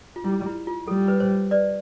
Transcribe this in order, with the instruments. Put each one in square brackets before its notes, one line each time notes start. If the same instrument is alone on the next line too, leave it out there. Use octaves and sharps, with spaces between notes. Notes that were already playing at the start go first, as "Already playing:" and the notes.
[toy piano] F4
[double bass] G3 [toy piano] E4
[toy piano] E4
F4
[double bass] G3 [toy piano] A4
[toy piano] B4
C5
B4 D5